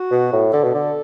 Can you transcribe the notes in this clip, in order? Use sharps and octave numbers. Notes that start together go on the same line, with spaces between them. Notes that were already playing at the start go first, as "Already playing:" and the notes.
Already playing: F#4
B2
A2
D3 A4
B2
D3